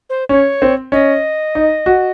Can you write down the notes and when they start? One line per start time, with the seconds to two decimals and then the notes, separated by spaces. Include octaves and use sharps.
0.10 C5
0.29 C#4 C#5
0.62 C4
0.92 C#4 D#5
1.55 D#4
1.86 F#4